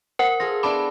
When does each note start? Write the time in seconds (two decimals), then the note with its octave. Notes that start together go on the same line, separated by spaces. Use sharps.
0.19 A#4 C5 F#5
0.40 F4 G#4 A4 A#6
0.63 B3 D4 E4 A5 B5 D6